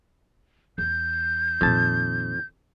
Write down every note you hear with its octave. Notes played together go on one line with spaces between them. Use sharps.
E2 G6
F2 A#2 D#3 A5